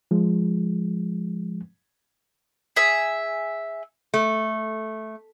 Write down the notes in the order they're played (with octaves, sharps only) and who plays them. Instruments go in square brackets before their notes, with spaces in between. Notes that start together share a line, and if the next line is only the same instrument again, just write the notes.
[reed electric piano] F3 G#3
[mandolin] G#4 E5
[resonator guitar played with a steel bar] A3